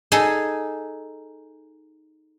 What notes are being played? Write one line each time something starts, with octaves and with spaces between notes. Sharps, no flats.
D#4 G#4 A4